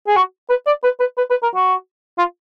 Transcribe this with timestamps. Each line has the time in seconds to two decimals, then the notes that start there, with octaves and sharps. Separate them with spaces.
0.07 G#4
0.16 F#4
0.49 B4
0.66 D5
0.84 B4
1.00 B4
1.18 B4
1.30 B4
1.43 A#4
1.55 F#4
2.18 F4